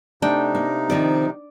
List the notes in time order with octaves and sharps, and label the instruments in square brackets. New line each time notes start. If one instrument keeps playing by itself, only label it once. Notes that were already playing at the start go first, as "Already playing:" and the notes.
[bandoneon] C3 D#4 [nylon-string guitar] A3 [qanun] D4 G5
[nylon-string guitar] A#3
[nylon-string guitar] D#3 F3 C4 [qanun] D5